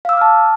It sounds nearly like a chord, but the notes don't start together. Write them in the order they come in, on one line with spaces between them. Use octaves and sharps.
F5 E6 D6 F6 A5